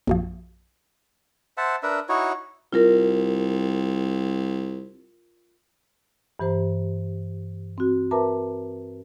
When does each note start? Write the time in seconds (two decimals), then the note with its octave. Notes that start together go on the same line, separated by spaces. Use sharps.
0.07 A#1 F#2 F3
1.57 C5 E5 F#5 A5
1.83 D4 A#4 B4 E5
2.09 D#4 E4 F#4 C#5
2.73 C2 F4 A#4
6.39 G2 E3 G4 C5 A#5
7.78 C4 F#4
8.11 A#4 B4 E5 A5 A#5 D6